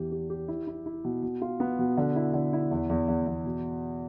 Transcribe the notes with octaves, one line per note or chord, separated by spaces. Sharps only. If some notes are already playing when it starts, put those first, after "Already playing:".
Already playing: E2 E3 G4
G4
G4
E4
E4
E4
B2
B2
F4
B3
B2
D3
E4
D3
E4
E2
E2
E2
E2
B2